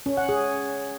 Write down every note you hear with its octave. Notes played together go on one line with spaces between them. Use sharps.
C#4
F#5
G#4